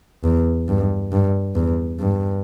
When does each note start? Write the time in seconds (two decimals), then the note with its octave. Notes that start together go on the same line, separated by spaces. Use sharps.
0.24 E2
0.68 G2
1.12 G2
1.55 E2
2.00 G2